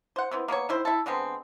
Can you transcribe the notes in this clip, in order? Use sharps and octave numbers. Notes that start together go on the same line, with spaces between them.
C5 F#5
E3 B3 C4
A#3 B3 A4 C#5
D#3 E4 C5
E4 A4
D3 G#3 B3 C4